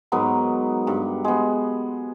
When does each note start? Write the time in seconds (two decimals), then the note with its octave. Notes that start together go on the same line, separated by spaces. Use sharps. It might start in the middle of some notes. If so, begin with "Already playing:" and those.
0.12 G#2 F#3 B3 A#4
0.87 G2
1.24 G#3 B3